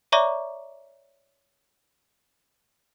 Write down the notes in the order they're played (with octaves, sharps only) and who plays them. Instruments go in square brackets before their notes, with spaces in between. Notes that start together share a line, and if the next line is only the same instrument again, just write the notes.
[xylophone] C#5 D5 E5 A#5 C#6 D6